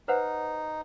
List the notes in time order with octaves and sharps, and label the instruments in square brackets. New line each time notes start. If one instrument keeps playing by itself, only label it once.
[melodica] D#4 [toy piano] B4 C5 F#5